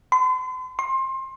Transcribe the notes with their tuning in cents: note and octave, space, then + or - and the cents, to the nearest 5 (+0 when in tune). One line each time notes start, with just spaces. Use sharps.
C6 -45
C6 +25